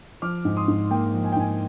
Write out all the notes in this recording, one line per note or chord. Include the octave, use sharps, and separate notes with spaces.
F3 D6 F6
G#2
C6 D#6
G#2
A#3 G5
F3
G#5
G5
G#2 G#5